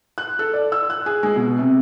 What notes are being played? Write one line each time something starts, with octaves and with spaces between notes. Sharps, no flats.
F#6
A4
D5
E6
F#6
G#4
G#3
B2
C3